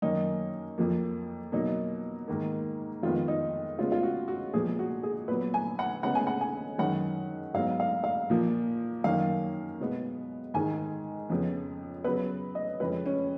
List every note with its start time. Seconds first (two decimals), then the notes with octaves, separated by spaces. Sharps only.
0.02 F#2 D#3 A#3 D#4
0.78 F2 F3 A#3
1.52 B2 F#3 A#3 D#4
2.28 G#2 D#3 A#3
3.03 F2 D#3 G#3 B3 F4
3.28 D#4
3.78 C#3 G#3 B3 F4
3.92 F4
4.03 F#4
4.28 F#4
4.54 A#2 F3 G#3 B3 G#4
4.79 F#4
5.03 G#4
5.28 A#2 F#3 B3 B4
5.54 G#5
5.79 F#5
6.03 C#3 G#3 B3 F#5
6.15 G#5
6.27 F#5
6.41 G#5
6.78 F#2 D#3 G#3 F#5
7.54 G#2 F#3 B3 F5
7.80 F5
8.04 F5
8.30 A#2 F3 A#3
9.04 F#2 D#3 A#3 F5
9.80 B2 G#3 B3
10.54 G#2 D#3 G#3 G#5
11.30 F2 C#3 F3 B3
12.04 C#3 F#3 B3 B4
12.55 D#5
12.80 F2 C#3 G#3 B4
13.06 C#4